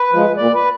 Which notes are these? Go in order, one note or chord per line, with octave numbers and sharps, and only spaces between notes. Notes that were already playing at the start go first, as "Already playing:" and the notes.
Already playing: B4
F3 G#3
A#2 D5
B4